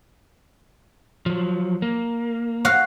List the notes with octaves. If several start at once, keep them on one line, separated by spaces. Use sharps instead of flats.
F3 F#3
A#3
F#4 F5